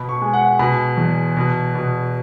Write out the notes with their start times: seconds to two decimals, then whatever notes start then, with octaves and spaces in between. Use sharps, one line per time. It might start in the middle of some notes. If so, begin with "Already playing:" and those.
Already playing: B2 B5
0.09 C#6
0.22 G#3
0.34 F#5
0.59 B2 B5
0.97 E2
1.37 B2
1.75 B2